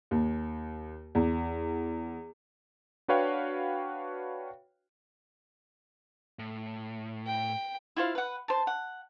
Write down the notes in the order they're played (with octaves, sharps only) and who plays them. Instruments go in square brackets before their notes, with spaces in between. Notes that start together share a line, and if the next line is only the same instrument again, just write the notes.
[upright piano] D#2
E2
[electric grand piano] D4 F#4 B4 C#5 F5 G5
[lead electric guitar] A2
[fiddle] G5
[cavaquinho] E4 F4 C5 F5
B4 F#5
C5 A5
F#5